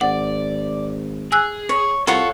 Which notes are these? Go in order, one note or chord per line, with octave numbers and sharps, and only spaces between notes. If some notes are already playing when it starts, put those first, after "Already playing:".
G#1 D5 F#5
G#4 G#5 E6 F#6
C#5
C2 F4 A4 C#5 F#5